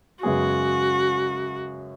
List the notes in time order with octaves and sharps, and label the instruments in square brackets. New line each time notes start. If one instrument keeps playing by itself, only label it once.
[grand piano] F#2 C#3 G#3 B3 G#4 [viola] F#4